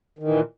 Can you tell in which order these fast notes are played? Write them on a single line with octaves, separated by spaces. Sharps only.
D#3 E3 A#2